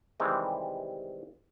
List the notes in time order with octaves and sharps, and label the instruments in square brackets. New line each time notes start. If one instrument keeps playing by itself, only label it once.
[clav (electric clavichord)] C3 D#3 E3 G3 G#3 C4